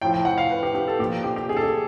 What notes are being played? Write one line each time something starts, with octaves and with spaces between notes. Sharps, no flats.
A2 F3 G5
G5
F#5
F5
B4
G4
G4
A4
A#2 F3 G4
G4
G4
G#4
A4
G#4